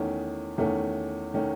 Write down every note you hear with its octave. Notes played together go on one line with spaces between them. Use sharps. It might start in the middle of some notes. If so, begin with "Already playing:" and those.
Already playing: E2 D#3 A3 C#4
E2 D#3 A3 C#4
D#3 A3 C#4